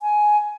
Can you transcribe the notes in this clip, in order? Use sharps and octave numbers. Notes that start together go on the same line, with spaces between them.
G#5